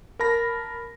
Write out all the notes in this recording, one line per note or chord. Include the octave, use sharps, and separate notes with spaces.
A#4 A5 B5 A#6